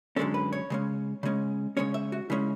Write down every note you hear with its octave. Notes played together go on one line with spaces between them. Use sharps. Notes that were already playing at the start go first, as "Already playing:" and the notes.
F#2 D3 G#3 C#4 A4
B4
C#5
C#3 G#3 C#4
C#3 G#3 C#4
C#3 G#3 C#4 C#5
E5
F#4
C#3 G#3 C#4 E4